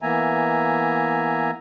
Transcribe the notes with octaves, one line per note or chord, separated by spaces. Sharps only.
E3 A#3 B3 E5 G#5 A#5